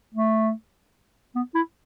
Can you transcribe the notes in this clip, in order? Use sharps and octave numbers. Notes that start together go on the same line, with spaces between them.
A3
B3
E4